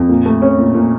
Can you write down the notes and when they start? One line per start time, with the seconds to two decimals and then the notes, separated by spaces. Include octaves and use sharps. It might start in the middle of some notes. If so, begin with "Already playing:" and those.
Already playing: F2
0.09 A#2
0.26 A3
0.42 C#4
0.59 A#2
0.75 A#2